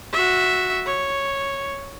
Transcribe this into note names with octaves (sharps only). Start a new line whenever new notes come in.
F#4 E5
C#5